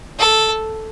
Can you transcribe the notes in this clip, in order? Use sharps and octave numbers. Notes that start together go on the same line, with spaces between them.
A4